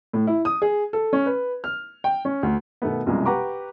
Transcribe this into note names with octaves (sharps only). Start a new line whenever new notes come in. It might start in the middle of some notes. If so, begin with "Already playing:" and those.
A2
E4
D#6
G#4
A4
C#4
B4
F6
G5
C#4
D2
B2 D#3 A3 B3
B1 F#2 C3 F3 G3 G#3
G4 B4 F#5 A#5 C#6 D6